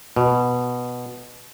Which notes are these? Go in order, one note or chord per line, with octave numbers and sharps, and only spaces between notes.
B2